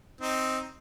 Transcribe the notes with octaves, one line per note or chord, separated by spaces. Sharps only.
C4 D#4